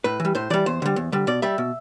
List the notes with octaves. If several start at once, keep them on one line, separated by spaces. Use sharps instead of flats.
A2 B4
E3
G3
A2 C5
E3 G3 D5
E2 C5
D3 G3
E2
D3 G3
B2 D5
G3 E5
B2